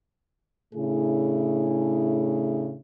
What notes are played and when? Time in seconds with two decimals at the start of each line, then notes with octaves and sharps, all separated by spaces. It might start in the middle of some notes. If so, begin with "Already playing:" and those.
0.74 A2 C#3 A3 D4 E4 G#4